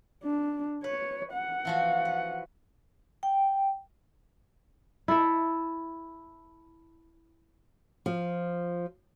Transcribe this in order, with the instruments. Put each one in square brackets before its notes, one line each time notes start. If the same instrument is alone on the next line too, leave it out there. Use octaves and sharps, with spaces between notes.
[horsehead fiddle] D4
[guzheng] B4 [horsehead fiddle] C#5
[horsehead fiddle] F#5
[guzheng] E3 F3 F#4
B4
[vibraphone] G5
[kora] E4 A4 E5
[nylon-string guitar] F3